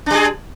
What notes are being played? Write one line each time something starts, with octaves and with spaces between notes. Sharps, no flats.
G3 D4 G#4